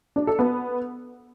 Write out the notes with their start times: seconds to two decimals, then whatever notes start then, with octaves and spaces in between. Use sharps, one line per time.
0.16 D4
0.27 A4
0.39 B3